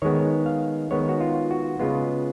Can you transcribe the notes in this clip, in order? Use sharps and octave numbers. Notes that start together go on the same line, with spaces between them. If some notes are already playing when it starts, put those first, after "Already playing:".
D#3 G#3 B3 C#5
F5
D#3 G#3 B3 C#5
F#4
F4
F#4
C#3 G#3 B3 F4